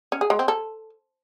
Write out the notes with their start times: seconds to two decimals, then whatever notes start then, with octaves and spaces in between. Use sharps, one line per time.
0.12 C#4
0.21 G#4
0.30 G#3
0.39 C4
0.48 A4